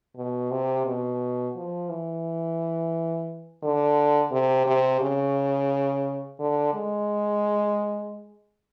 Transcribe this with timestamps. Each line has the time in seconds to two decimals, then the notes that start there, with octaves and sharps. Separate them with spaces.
0.17 B2
0.51 C3
0.86 B2
1.55 F3
1.89 E3
3.63 D3
4.31 C3
4.66 C3
5.01 C#3
6.40 D3
6.74 G#3